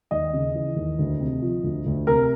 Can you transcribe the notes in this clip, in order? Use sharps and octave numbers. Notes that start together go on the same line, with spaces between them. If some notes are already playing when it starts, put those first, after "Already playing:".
D#2 D#5
C#3
E3
D#2
D2
C3
F3
D2
D2
C3 A#4